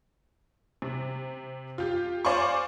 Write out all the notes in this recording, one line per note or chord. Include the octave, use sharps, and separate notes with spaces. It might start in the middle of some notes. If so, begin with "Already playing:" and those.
C3
F4 G4
C5 D5 F5 G#5 C6 C#6